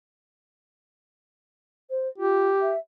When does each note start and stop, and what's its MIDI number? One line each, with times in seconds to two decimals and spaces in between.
1.90 2.08 72
2.18 2.48 65
2.18 2.72 67
2.61 2.78 76